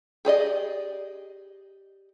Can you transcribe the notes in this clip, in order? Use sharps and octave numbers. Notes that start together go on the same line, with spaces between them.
G4 G#4 D5 D#5